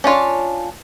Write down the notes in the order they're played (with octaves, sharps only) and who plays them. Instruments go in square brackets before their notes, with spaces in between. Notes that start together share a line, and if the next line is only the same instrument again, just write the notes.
[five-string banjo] C#4 D4 F4 C#5